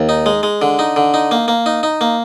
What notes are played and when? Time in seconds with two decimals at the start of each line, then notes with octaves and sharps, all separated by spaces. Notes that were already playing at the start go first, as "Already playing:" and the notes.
Already playing: D#2
0.09 D#4
0.26 G#3
0.43 G#3
0.62 D3
0.79 D#4
0.96 D3
1.14 D#4
1.31 A#3
1.48 A#3
1.66 D#4
1.83 D#4
2.01 A#3